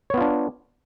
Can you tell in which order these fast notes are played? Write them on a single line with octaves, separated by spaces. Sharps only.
C#5 B3 F4 D4